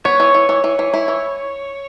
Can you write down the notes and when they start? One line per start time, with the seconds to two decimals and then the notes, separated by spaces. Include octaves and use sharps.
0.05 B3 C#5
0.20 E3
0.34 E3
0.49 E3
0.64 E3
0.79 E3
0.94 E4
1.08 E3